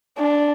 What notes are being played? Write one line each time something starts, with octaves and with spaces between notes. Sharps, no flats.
D4